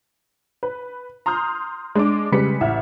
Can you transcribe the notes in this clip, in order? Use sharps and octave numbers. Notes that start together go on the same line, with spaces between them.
B4
A#5 C6 D#6 F6 G6
G#3 D4 D6
C#3 G3 G#3 B4 B6 C#7
A1 E5 F#5 F6